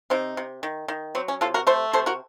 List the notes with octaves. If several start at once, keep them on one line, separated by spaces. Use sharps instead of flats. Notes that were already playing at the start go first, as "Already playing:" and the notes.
C3 C4 D#4
C3
D#3
D#3
F#3 C4
C#4
C3 F4 A4
F#4 A#4
A3 A4 C5
C3 A4 C5
F#4 A#4